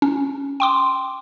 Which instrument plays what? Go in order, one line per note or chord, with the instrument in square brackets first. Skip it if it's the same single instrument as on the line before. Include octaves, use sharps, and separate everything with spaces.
[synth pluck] C#4
G5 C6 D6